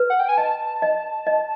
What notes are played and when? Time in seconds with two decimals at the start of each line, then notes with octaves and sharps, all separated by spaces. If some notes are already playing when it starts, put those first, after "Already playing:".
Already playing: B4
0.10 F#5
0.20 G5
0.29 G#5
0.38 D#5 A5
0.82 D#5
1.27 D#5